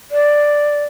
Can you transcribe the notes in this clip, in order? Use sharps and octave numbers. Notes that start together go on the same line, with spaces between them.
D5